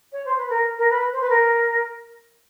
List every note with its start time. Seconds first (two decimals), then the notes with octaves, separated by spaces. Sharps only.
0.12 C#5
0.25 C5
0.38 B4
0.50 A#4
0.78 A#4
0.90 B4
1.12 C5
1.21 B4
1.30 A#4